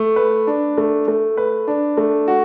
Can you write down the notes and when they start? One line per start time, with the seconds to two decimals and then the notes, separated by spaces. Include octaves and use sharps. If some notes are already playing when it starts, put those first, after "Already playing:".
Already playing: A3
0.16 B4
0.47 D4
0.78 A3
1.08 A3
1.37 B4
1.68 D4
1.97 A3
2.28 F#4